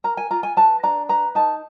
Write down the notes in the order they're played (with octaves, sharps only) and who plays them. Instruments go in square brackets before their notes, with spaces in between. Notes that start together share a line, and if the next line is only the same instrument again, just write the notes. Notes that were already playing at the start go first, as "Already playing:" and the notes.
[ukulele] A#4 A#5
G#5
F4 A#5
G#5
B4 A5
D4 A#5
B4 A#5
D#4 A5